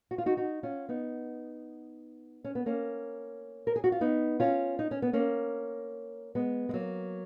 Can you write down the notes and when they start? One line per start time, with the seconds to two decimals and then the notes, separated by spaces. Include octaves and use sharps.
0.11 F#4
0.18 F4
0.26 D#4 F#4
0.37 D#4 F#4
0.63 C#4 F4
0.89 B3 D#4
2.44 C#4
2.55 B3
2.66 A#3 C#4
3.67 A#4
3.76 G#4
3.84 F#4
3.92 F4
4.01 B3 D#4
4.40 C#4 F4
4.79 D#4
4.91 C#4
5.02 B3
5.13 A#3 C#4
6.35 G#3 B3
6.69 G#3
6.73 F#3 A#3